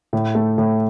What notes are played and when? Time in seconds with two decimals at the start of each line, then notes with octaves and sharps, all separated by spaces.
0.13 A2
0.35 A3
0.58 A2